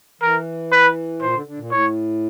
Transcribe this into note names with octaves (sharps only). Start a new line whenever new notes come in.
E3 A#4
B4
A#2 C5
D3
D3
A#2
A2 C#5